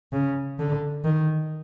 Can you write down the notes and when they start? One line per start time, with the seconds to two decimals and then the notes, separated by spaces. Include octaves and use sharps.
0.12 C#3
0.59 D3
1.04 D#3